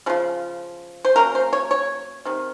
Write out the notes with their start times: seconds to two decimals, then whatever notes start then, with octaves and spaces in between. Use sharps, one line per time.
0.06 C#3 F3 F4
1.05 C5
1.16 F#3 A#3 C#4 A#4
1.35 C5
1.53 C#5
1.71 C#5
2.25 C3 D#3